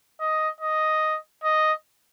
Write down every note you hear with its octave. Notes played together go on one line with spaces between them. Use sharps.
D#5
D#5
D#5